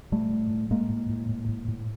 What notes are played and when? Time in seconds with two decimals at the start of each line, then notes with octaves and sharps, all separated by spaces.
0.12 A2 G3 A3
0.31 A2
0.50 A2
0.71 A2 G#3 A#3
0.89 A2
1.09 A2
1.29 A2
1.49 A2
1.68 A2